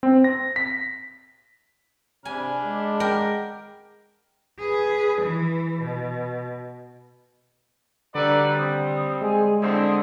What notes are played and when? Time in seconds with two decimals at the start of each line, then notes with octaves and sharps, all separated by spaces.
0.03 C4
0.24 A#6
0.56 B6
2.25 C3 D4 G#5 B5 F6
2.64 G#3 F#5 A5 D6
3.00 A#4 G5
4.59 G#4 B4
5.22 E3
5.82 B2
8.15 D3 G3 F#4 B4 D5 A#5 E6
8.57 C4 D#6
9.21 G#3 G#4 D5 G#5
9.62 D3 C4 E4 D#6